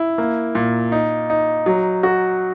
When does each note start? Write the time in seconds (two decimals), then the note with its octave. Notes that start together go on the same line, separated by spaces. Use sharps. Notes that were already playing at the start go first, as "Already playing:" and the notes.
Already playing: E4
0.18 A#3
0.55 A#2
0.92 D#4
1.30 D#4
1.66 F#3
2.03 F#4